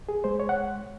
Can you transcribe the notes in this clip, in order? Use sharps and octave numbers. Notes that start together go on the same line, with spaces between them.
G#4
G#3 C5
C#5
F#5